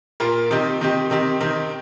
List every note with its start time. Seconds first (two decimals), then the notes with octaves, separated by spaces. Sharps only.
0.20 A#2 A#3 F4 A#4
0.51 C3 D#3 C4 D#4 G4
0.81 C3 D#3 C4 D#4 G4
1.10 C3 D#3 C4 D#4 G4
1.40 C3 D#3 C4 D#4 G4